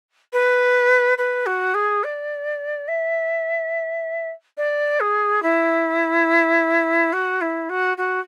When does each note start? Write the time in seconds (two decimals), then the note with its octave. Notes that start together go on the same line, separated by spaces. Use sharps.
0.33 B4
1.18 B4
1.46 F#4
1.74 G#4
2.04 D5
2.88 E5
4.57 D5
5.00 G#4
5.43 E4
7.13 F#4
7.41 E4
7.69 F#4
7.97 F#4